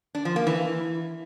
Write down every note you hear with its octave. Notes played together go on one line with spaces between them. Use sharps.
D4
F3
A#3
E3